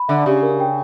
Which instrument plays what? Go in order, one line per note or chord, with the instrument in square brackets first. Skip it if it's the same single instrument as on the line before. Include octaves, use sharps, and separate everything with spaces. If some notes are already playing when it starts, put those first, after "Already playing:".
Already playing: [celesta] B5
[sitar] D3 [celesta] E5
[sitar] C#3 [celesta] G4
[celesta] A#4
G5